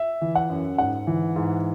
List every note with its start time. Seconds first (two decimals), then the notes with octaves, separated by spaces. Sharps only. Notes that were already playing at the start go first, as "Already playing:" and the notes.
Already playing: E5
0.21 E3
0.35 F#5
0.50 F#2
0.78 G#2 F#5
1.07 E3
1.36 G#2